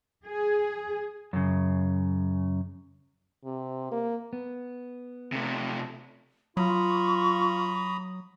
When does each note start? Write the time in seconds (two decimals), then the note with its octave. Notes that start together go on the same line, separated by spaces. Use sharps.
0.25 G#4
1.33 F#2 C#3
3.45 C3
3.92 A#3
4.33 B3
5.32 C3 A3
6.57 F#3 F4 A#5 B5 C#6 D#6